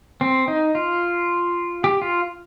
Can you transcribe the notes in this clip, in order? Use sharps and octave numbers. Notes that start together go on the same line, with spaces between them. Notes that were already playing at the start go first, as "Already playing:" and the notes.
C4
D#4
F4
G4
F4